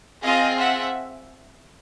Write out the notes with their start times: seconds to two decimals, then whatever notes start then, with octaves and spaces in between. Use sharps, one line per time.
0.23 C4 F4 G#4 D#5 F5
0.58 E5 F#5